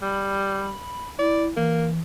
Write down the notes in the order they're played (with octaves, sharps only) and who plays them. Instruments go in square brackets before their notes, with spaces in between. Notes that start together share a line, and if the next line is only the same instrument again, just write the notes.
[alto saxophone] G3 [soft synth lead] B5
[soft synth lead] E4 [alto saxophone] D5
[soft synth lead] E3 [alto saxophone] A#3